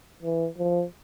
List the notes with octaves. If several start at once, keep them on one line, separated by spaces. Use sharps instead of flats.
E3
F3